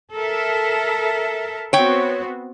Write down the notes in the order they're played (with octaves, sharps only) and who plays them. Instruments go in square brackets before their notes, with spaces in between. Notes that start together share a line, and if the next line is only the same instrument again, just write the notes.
[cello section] A4 A#4 E5
[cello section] B3 C4 F#4 [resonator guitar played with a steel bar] C#5 G5